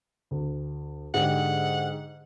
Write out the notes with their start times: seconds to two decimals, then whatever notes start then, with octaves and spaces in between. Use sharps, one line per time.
0.31 D2
1.14 G#2 D3 G4 F#5